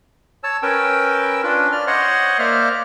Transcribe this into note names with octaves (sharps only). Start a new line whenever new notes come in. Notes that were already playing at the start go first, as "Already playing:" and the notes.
C#5 A5 E6
C#4 A#4 B4 G5 E6
C#4 D4 F4 B4
D5 F6
C5 C#5 D#5 F#5 C6 C#6
A#3 C5 D5 E5 F6